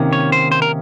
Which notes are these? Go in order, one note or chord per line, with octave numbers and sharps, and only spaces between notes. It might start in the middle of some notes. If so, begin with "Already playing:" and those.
Already playing: C3 D#3 A#3 C#4
C#5
C5
C5
A#4